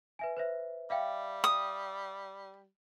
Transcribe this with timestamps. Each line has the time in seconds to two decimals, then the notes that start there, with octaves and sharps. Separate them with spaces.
0.19 B4 E5 G#5
0.37 B4 C5 E5
0.90 G3 E5 F5 G5
1.44 D#6